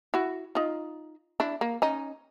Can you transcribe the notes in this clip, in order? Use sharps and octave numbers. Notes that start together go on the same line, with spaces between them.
E4 F#4
D#4 F4
D4 E4
A#3
C#4 D#4